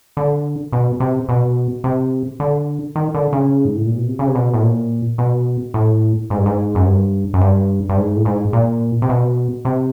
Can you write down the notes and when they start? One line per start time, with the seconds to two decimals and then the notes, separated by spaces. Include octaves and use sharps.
0.17 D3
0.72 B2
1.00 C3
1.29 B2
1.84 C3
2.40 D3
2.96 D#3
3.15 D3
3.33 C#3
3.65 G#2
3.76 A2
3.86 A#2
3.97 B2
4.07 C3
4.19 C#3
4.27 C3
4.35 B2
4.54 A2
4.63 A#2
5.18 B2
5.74 A2
6.30 G#2
6.38 G2
6.46 G#2
6.75 F#2
6.85 G2
7.34 F#2
7.41 G2
7.89 G2
7.97 G#2
8.16 A2
8.25 G#2
8.53 A#2
9.02 C3
9.09 B2
9.65 C3